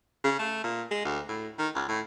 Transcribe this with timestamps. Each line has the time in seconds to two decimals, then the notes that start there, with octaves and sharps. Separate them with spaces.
0.24 C#3
0.39 A3
0.64 A#2
0.91 G#3
1.05 D2
1.29 A2
1.59 D#3
1.75 C#2
1.89 A2